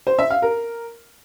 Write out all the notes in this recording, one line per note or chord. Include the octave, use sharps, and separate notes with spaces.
C5
E5
F5
A#4